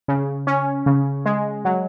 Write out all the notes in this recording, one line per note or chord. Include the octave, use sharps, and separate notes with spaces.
C#3
C#4
C#3
G#3
F#3